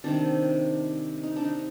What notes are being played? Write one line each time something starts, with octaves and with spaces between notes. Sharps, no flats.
C3 D#3 G3 D4
D#4
D4
D#4